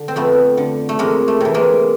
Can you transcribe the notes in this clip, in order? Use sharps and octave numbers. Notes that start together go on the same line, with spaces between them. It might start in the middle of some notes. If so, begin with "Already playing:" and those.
Already playing: D3
C4
F2 A3 B3
D3
A3
F2 G#3 A#3
A3
C3 E3
G#3 A#3